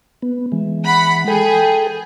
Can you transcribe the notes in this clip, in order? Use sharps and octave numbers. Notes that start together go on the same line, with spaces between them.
B3
E3 G#3
F#5 B5
G#4 A4 G5